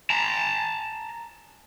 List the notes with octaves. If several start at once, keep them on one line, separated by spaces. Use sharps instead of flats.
A5 A#5